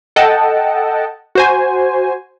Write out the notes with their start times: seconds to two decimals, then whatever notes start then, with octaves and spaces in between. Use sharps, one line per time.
0.16 A4 D#5 F#5 G5 A5
1.35 F#4 C5 G#5